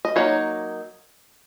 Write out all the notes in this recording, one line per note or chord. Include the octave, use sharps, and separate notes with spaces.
D#5
F#3 A#3 D#4 C#5